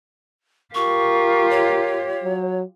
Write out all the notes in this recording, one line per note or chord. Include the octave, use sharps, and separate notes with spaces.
F4 G4 A#4 C#6
C#5
F#3